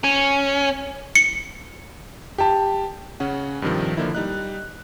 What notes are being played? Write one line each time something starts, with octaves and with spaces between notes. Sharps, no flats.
C#4
C#7
G4 A5
C#3 C#4 F#5
G2 C3 D#3 F3
D3 F3 A#3 D#4 E4
G3 D#4 F#6